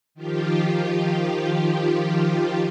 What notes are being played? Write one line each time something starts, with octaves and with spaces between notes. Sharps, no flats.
D#3 F3 F4 G4